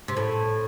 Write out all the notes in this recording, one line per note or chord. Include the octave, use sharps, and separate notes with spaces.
C3
A2